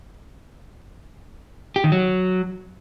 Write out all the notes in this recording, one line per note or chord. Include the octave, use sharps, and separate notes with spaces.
G4
D#3
F#3